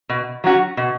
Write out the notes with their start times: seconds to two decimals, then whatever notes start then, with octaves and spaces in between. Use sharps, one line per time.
0.09 B2
0.44 F#3 C#4 F#4
0.77 B2